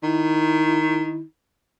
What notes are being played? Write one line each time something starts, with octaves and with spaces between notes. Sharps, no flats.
D#3 E4